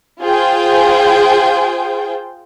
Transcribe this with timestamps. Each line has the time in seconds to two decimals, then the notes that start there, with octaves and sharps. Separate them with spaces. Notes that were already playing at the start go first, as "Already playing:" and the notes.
0.21 F4 G#4 C5 G5